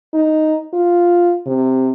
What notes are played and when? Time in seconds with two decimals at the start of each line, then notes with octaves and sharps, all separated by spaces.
0.14 D#4
0.73 F4
1.46 C3